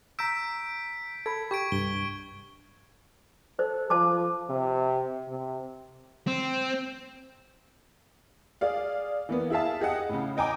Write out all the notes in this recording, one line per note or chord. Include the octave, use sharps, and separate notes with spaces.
A#5 E6 G6 B6 D7
A4 B5 G#6
G4 C#6 G#6 D7
C2 G2 G7
A4 C5
F3 C5 A5 D6
C3
C3
C4
G#4 D5 F5
E3 A#3 B3
E4 G#4 E5 F5 A5
G4 G#4 D#5 F#5
A2 C#3
D#5 G5 G#5 A#5 D6